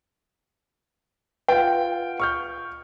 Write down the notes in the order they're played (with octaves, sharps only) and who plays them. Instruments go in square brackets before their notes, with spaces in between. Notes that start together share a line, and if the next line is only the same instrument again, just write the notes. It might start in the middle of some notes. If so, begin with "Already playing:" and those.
[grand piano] F4 F#5 G5 [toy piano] B4
[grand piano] C#6 F6 G6